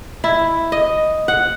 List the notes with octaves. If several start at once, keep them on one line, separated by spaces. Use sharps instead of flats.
E4
D#5
F#5